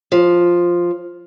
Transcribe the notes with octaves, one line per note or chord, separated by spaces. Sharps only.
F3